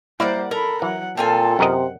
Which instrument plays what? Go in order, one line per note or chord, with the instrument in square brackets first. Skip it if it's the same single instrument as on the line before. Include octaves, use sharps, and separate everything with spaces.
[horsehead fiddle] G3 C5 [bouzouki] A#3 D5 F#5 [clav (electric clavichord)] E4
[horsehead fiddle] A4 B5 [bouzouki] A#4
[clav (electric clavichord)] E3 [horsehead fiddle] F#3 F#5
[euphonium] A#2 [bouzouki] C4 F4 G#5 [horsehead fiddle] A4 A5
[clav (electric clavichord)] F#2 A#4 D#5 [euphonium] C3 [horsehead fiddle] F#5